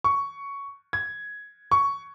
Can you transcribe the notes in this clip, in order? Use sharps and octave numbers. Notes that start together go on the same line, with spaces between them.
C#6
G#6
C#6